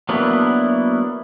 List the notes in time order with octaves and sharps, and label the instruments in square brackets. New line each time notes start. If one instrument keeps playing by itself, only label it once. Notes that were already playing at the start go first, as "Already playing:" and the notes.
[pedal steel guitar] F#3 A#3 B3 D4 E4